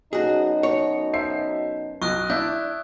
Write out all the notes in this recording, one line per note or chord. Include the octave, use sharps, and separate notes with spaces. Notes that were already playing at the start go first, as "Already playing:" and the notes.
F#2 B2 D#4 F#4 G#4
C#5
C5 E5 C7
B1 C#6 D#6 F#6
D4 E4 G6